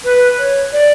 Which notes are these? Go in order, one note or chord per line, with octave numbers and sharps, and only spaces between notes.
B4
C#5
D5